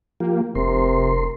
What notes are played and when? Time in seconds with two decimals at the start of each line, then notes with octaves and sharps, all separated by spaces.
0.20 F3 A#3 F4 G4
0.55 F1 C3 A#4 C6